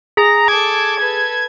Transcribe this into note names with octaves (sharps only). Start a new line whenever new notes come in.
G#4 A#5
A4 D6 G#6
A4 B4